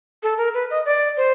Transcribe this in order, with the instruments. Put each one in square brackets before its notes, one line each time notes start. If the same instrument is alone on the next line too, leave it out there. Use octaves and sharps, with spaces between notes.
[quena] A4
A#4
B4
D#5
D5
C5